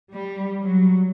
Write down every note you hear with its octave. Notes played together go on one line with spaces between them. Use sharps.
G3
F#3